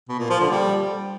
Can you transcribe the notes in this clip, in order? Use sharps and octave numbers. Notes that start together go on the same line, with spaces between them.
B2
A#2
F3
D3
G3